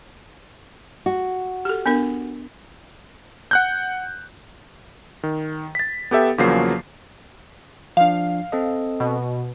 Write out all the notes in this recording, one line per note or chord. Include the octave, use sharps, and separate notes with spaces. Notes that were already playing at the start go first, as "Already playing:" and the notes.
F#4
G4 A4
B3 D4 A#4
F#5 F#6 G6
D#3
A6 B6
B3 G4 A4 E5 G5
E2 C#3 F3 F#3 A#3 C7
F3 D4 F5
C4 A4 D#5
B2